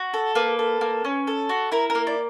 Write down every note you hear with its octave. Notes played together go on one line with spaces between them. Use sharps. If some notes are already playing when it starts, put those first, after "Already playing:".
Already playing: F#4
A4
A#3 B4
A4
A#3
C#4
A4
F#4
E4 A#4
A#4
A#3
D5